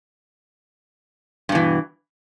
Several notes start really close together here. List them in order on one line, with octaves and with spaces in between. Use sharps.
G2 B2 E3